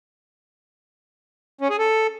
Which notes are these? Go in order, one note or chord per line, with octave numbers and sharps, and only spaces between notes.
C#4
G#4
A4